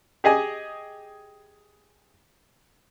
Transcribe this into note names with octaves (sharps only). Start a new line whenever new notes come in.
G4 G#4 D#5 G#5